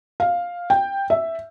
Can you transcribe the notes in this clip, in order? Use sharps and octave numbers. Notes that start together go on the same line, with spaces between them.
F5
G5
E5